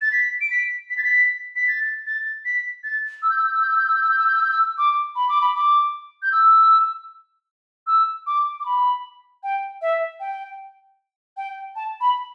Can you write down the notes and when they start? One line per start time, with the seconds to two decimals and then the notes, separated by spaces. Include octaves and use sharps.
0.01 A6
0.12 B6
0.41 D7
0.50 B6
0.90 B6
0.97 A6
1.04 B6
1.56 B6
1.68 A6
2.06 A6
2.45 B6
2.83 A6
3.22 E6
3.30 G6
3.38 E6
3.46 G6
3.54 E6
3.62 G6
3.70 E6
3.78 G6
3.87 E6
3.95 G6
4.03 E6
4.10 G6
4.18 E6
4.27 G6
4.35 E6
4.43 G6
4.51 E6
4.78 D6
5.15 B5
5.29 D6
5.41 B5
5.55 D6
6.22 G6
6.32 E6
7.87 E6
8.27 D6
8.60 D6
8.65 B5
9.43 G5
9.81 E5
10.20 G5
11.37 G5
11.76 A5
12.01 B5